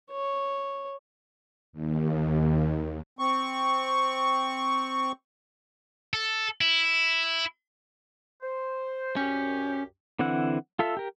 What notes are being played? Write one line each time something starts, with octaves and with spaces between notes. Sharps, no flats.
C#5
D#2
C4 C#6
A4
E4
C5
C2 F#2 C#4 G4
D3 E3 C4 E4 F#5
F4 A4 E5
G4 A#4